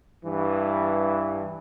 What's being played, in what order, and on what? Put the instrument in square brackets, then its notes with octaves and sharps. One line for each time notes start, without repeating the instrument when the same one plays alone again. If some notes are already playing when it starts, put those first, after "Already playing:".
[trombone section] G2 E3